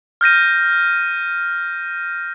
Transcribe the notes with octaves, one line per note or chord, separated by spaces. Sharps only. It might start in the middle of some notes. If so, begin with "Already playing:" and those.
F6 G6 A#6 D#7